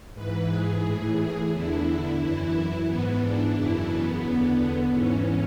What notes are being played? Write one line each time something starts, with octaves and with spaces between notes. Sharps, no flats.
G#2 E3 B4
G#4
A2 E3
E2 D3 E4
F#2 E3
G#2 E3 B3
D4
F#2 C#3 E3 E4
B3
E2 D3
G#2 E3 C#4